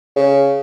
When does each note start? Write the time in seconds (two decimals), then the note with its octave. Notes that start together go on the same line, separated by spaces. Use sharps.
0.16 C#3